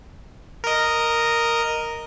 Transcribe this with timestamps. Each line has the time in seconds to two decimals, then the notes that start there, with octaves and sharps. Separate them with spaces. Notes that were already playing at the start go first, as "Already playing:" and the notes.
0.64 A#4 D#5